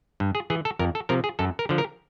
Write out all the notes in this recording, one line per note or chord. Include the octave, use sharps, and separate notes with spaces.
G2
G#4
E3 G#4
A4
F2 A#4
A4
C3 F3 A#4
G#4
F#2 A4
A#4
D3 F3
A#4